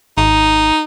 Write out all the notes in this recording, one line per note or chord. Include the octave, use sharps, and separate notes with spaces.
G#1 D#4